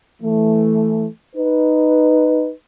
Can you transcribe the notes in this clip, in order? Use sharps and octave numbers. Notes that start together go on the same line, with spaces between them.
E3 A3
D#4 B4